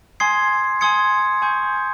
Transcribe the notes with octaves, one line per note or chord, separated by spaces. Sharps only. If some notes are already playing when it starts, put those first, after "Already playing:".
G#5 C6 D#6 G#6 C7
G#5 C6 D#6 G#6 C#7
G#5 C#6 G6 C#7